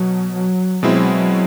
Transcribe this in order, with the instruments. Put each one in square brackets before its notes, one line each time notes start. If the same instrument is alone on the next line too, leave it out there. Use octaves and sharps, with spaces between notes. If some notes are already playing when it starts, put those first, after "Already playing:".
Already playing: [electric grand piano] B2 [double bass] F#3
[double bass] F#3
[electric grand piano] B2 G#3 C4 E4 [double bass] F#3